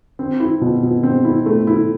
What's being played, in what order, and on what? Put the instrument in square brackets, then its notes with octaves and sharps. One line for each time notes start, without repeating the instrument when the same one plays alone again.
[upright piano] C4
E4
B2
B2
C4
E4
A3
E4